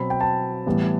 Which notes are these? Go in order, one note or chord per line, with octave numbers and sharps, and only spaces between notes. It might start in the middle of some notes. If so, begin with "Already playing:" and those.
Already playing: B2 F#3 C4 B5
G5
A5
A2 E3 G3 B3